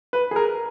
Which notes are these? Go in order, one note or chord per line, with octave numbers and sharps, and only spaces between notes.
B4
G#4
A#4